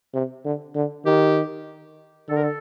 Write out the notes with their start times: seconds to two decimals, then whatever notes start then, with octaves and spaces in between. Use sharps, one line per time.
0.14 C3
0.45 D3
0.75 D3
1.06 D#3 G4
2.29 D3 A4
2.36 A#4
2.43 A4